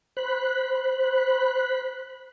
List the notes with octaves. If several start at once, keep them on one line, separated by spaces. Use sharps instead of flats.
C5 B5 F#6